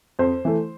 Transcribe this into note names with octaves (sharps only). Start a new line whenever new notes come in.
F2 C5
E3 A3